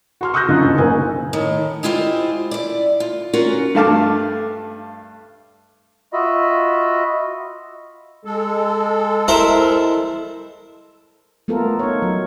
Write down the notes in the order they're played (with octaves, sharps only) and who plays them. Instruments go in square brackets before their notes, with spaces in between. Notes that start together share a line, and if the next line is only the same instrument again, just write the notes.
[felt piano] F#4 C6 F6
C#6 D#6 E6 F#6 G6 A#6
F#2 D3 D#4 F4
F#1 C#2
F#1 B1 A#3 D#5 G#5
[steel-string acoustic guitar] A2 D#3
G#3 E4 F4 G4 C5
E4 D5
F4
C#4 F4 F#4 A#4
[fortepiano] G2 A3 F5 A5 D6
[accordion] F4 F#4 D#5 E5 B5
G#3 A4
[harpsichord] E4 A#4 C5
[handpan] A3 B3 F4 A4 A#4
D#4 C#5
F#3